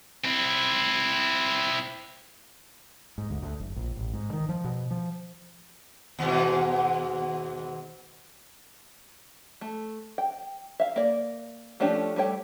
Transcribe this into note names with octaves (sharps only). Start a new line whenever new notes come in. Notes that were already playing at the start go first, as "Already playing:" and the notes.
C4 E4
G#2
D2
D2
F#1
A#1
A1
G#2
D#3
F3
B2
F3
D#2 G#2 B2
A3
G5
E5 F5
A#3 D5
F3 A3 C#4 D4 G4
G3 A3 C#5 G5